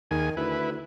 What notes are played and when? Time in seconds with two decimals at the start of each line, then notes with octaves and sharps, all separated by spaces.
0.11 D#2 D#3 G#4 G#5
0.37 D2 E4 B4